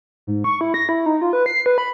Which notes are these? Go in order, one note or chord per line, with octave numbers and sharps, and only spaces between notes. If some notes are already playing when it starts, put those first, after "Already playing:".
G#2
C#6
E4
A#6
E4
D#4
F4
B4
C7
B4
B5